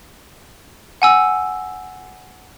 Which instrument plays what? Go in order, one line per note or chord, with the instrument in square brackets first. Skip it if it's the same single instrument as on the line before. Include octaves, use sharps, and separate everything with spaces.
[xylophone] F#5 G#5 E6